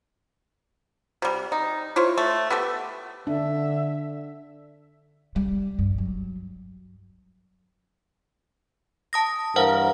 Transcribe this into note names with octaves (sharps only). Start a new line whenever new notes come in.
C3 G3
D#4
E4 F4 C5 C#5
A3
B3 G4 A4
D3 D4 E5
G3
G2
F#3
A5 D#6 A#6
G2 E3 A#4 C5 F5 F#5